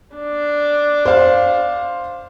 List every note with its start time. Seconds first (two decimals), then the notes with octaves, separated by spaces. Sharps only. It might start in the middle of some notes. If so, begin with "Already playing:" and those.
0.15 D4
1.05 C5 F5